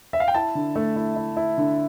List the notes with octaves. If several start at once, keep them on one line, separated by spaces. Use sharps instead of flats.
E5
F5
G5
E4 A5
D3
A3
E4
E4
E4
D3